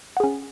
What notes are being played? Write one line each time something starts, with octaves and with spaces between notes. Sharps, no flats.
C#4 G#4 F#5